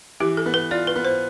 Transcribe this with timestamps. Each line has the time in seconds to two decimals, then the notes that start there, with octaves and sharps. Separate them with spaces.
0.20 E3 G4
0.37 A4
0.46 B3
0.54 B4
0.71 F4 D5
0.87 B4
0.96 B3
1.05 C5